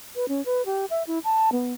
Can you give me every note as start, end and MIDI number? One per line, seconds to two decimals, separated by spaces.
0.16 0.28 71
0.28 0.44 61
0.46 0.65 71
0.66 0.85 67
0.90 1.03 76
1.07 1.19 64
1.24 1.50 81
1.52 1.73 59